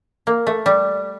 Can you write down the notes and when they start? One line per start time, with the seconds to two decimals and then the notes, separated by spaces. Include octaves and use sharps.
0.27 A#3
0.47 A3
0.66 G3